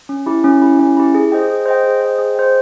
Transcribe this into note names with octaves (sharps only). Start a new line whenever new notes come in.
C#4
E4 G4
C#4
E4 G4
C#4
E4 G4
G#4
C5 D#5 G5
G#4
C5 D#5 G5
G#4
C5 D#5 G5
G#4
C5 D#5 G5